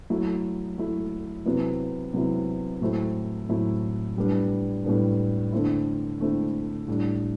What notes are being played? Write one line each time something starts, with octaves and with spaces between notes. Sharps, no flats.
F#3 A3 E4
F#3 A3 E4
C3 F#3 B3 E4
C3 F#3 B3 E4
A2 F#3 A3 C4 E4
A2 F#3 A3 C4 E4
A2 G3 B3 D4
A2 G3 B3 D4
D3 A3 C4 E4
D3 A3 C4 E4
A2 G3 D4